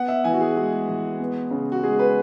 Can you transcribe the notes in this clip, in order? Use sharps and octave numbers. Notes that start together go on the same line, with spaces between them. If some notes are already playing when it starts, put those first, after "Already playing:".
Already playing: B3 F#5
E5
E3 G#5
F#4
G#4
G#3 F#4
E3
B3
C#3
F#4
G#3 G#4
B4